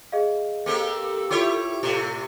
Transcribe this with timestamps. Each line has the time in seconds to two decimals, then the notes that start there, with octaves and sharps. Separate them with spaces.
0.12 G#4 D#5 F5
0.66 A#3 C4 G4 A4
1.31 E4 F4 G4 C#5
1.83 A2 C3 A4